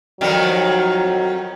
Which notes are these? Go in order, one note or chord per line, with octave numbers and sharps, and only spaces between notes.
F2 D#3 F#3 G3